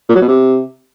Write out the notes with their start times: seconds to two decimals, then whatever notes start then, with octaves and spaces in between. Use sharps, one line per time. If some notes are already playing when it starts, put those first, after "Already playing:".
0.09 A#2
0.15 F#3
0.22 B2
0.28 C3